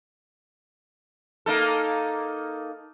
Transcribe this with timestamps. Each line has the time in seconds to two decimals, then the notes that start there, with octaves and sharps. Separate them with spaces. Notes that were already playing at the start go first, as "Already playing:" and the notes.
1.46 A#3 D#4 A4